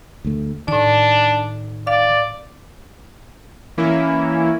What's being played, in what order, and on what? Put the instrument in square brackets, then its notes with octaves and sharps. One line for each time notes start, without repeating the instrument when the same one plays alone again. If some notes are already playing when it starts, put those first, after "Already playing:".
[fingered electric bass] D2 A3
[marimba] A2 D5 [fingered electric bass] D#3 [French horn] D4
[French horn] D5 [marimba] F5
[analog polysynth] E3 A#3 C#4 E4